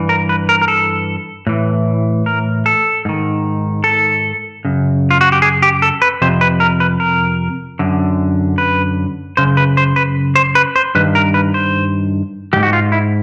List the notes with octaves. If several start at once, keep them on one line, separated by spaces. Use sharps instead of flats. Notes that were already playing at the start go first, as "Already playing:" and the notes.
Already playing: G2 E3
A#4
B4
A#4
A#4
A4
A2 E3
A#4
A4
G#2 D#3
A4
F#2 C#3
F4
F#4
G4
G#4
G4
A4
B4
F2 C3 C5
B4
A#4
B4
A#4
F#2 D3
B4
F#2 C#3 C5
B4
C5
B4
C5
B4
C5
G2 D#3 B4
A#4
B4
C5
G#2 E3 G4
F#4
F4
E4